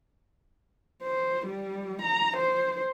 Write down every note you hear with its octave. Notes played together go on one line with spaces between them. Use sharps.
C5
G3
A#5
C5